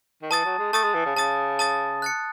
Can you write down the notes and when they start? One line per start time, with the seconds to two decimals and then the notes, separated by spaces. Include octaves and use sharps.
0.22 D#3
0.30 E3 A5 D#6 A6
0.45 F#3
0.59 G#3
0.73 A3 A5 D#6 A6
0.84 G#3
0.94 E3
1.05 C#3
1.16 C#3 A5 D#6 A6
1.59 A5 D#6 A6
2.02 F#6 A6 C#7